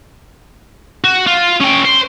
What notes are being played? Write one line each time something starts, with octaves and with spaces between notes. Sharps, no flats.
F#4
F4
C#4 G5
C5